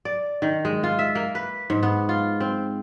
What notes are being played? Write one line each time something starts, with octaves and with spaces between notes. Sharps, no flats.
D5
D#3
G#3
F4
E5
A#3
B4
G#2
B3
F4
C4